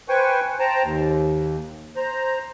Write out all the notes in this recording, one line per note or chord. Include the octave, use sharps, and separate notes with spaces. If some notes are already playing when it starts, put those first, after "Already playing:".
B4 C5 G5 G#5 C#6
C5 G5 A5 A#5
D#2
C5 A#5